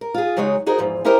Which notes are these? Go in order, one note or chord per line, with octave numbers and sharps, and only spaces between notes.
A#4
F4 G#4
C#3 F#3 G#3 D#4 C#5
D#4 F#4 G#4 A#4 C5 D#5
E2 G#2 F3
C#4 D#4 E4 G4 A#4 C5